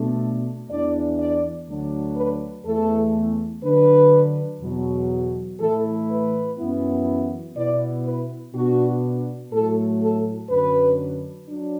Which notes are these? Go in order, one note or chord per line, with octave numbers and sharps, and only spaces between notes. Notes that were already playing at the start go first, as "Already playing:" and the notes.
Already playing: B2 A3 D4
E2 E3 D4 D5
D5
D2 D3 F#3 D4
B4
E2 E3 A3 A4
D3 F#3 D4 B4
E2 B2 F#3
A2 E3 A3 E4 A4
B4
F#2 E3 B3 E4
B2 B3 E4 D5
B4
B2 B3 D4 F#4
A2 F#3 A3 A4
A4
F#2 D3 F#3 D4 B4
F#3 D4